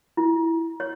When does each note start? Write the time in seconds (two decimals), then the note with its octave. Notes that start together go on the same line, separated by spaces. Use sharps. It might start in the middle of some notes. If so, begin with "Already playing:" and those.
0.17 E4
0.80 C#5